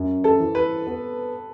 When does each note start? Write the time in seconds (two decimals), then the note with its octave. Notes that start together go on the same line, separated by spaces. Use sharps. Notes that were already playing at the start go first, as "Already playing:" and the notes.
Already playing: F#2
0.24 A4
0.40 E3
0.55 B4
0.87 B3